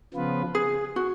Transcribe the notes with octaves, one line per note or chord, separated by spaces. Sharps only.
C#3 F3 B3 F4 B4
G#4
F#4